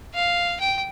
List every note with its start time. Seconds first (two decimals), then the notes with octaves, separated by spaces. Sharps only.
0.15 F5
0.60 G5